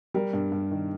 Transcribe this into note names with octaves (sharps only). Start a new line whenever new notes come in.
G3 A#4
G2
G2
D#3